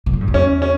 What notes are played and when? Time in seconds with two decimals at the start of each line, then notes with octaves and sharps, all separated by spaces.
0.06 B2
0.13 A2
0.21 G2
0.28 F#2
0.34 E2 C#4
0.62 C#4